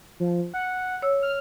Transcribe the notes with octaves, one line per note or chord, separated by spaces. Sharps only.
F3
F#5
C#5 E6
F6